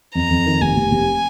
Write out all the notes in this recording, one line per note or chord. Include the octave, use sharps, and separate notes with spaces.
F2 A#5
F2
D#3
F1 G#5
F1
F1